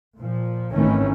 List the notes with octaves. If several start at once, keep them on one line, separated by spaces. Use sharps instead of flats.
A#2 F3
G#1 A2 D#3 E3 A3 C#4